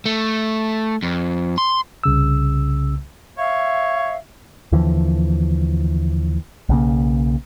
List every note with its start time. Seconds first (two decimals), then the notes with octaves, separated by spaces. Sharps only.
0.06 A3
1.03 F2
1.58 C6
2.04 C2 C#3 E6
3.38 C#5 E5 F5
4.72 D#2 D3 E3 F3
6.69 B1 C#3 A#3